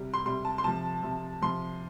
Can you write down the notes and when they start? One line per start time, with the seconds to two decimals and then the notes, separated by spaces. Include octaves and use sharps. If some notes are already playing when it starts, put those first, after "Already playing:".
Already playing: C3 G3
0.14 C6
0.25 C3 G3 C6
0.45 A5
0.58 C6
0.64 C3 F3 A5
1.03 C3 F3
1.41 C3 F3 C6